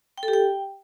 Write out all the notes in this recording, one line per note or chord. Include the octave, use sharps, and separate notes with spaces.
G5
A4
G4
G5